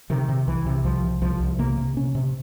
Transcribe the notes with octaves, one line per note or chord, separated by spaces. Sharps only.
C3 D#3
C3
C2 E3
C3
C2 F3
C3
C2 F3
C2
C3 A#3
C3
C3 C#4
C3